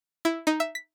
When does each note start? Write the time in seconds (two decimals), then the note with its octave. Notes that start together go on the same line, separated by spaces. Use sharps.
0.25 E4
0.47 D#4
0.60 E5
0.75 B6